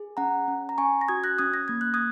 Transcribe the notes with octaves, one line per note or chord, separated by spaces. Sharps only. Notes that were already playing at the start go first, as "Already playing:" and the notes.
Already playing: G#4
C#4 F#5 A#5
C#4
A#5
C#4 G#5 C#6
A#6
F#4 D#6 G#6
F#6 A#6
C#4 D#6 G#6
A#6
A#3 G#6
F#6
D#6 G#6